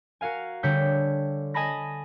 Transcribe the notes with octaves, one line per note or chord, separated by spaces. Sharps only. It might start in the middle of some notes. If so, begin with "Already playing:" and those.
F#4 A#4 F5 G#5
D3 G3 C#5 G6 B6
D#5 G#5 A5 B5 A#6